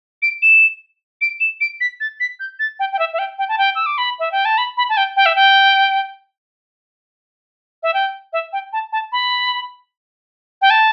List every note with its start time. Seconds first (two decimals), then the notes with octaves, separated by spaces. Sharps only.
0.22 D7
0.42 E7
1.21 D7
1.40 E7
1.61 D7
1.81 B6
2.00 A6
2.20 B6
2.40 G6
2.59 A6
2.79 G5
2.92 G5
2.99 E5
3.13 E5
3.19 G5
3.39 G5
3.49 A5
3.58 G5
3.75 E6
3.86 D6
3.98 B5
4.19 E5
4.32 G5
4.45 A5
4.58 B5
4.77 B5
4.89 A5
4.97 G5
5.17 G5
5.26 E5
5.36 G5
7.83 E5
7.94 G5
8.33 E5
8.53 G5
8.73 A5
8.92 A5
9.12 B5
10.62 G5
10.70 A5